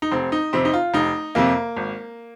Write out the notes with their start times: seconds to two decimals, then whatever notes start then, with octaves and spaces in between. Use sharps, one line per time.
0.02 D#4
0.12 F1 C4
0.32 D#4
0.53 F2 C3 C4
0.65 D#4
0.73 F4
0.94 F1 D#4
1.35 F2 C3 A#3
1.76 G#1